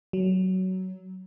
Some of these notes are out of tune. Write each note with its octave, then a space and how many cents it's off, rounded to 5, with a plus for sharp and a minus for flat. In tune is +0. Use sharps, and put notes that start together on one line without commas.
F#3 +15